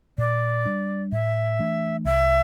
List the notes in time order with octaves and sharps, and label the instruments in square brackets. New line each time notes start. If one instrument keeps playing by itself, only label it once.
[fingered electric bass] A#2 [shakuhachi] D5
[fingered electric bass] G3 D4
[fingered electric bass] A2 [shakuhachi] E5
[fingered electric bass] E3 A3 D4
[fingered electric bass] C2 [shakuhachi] E5